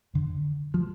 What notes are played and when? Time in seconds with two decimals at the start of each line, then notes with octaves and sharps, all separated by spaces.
0.14 F2 D3
0.74 F3